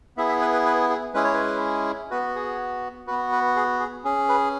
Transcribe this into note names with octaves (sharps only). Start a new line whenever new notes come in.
B3 E4 G#4 E5
E5
B4
B4
B4
G#4
G#3 C#4 E4 G#4 B4
C#5
B4
B3 F#4 B4
G#4
B3 F#4 B4
B4
G#4
G#4
C#4 G#4
B4